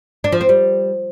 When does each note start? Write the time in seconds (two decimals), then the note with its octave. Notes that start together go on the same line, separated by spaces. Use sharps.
0.24 D4
0.32 F3
0.41 C4
0.49 G3